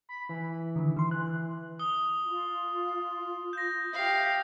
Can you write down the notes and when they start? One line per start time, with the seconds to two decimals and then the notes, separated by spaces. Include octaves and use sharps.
0.09 B5
0.29 E3
0.76 D3 D#3
0.97 E3 C6
1.11 E3 F#6
1.79 D#6 G7
2.24 F4
3.53 G6 A#6
3.93 G4 E5 F5